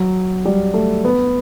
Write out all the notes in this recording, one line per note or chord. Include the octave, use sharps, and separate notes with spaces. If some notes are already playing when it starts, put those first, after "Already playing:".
Already playing: F#3
G3
A3
B3